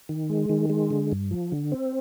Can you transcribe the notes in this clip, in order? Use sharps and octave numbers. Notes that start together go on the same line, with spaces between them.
D#3
G#3
D#3
G#3
D3
G2
F3
D3
C4